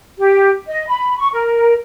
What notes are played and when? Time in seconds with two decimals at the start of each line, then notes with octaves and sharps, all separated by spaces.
0.18 G4
0.67 D#5
0.88 B5
1.18 C#6
1.33 A#4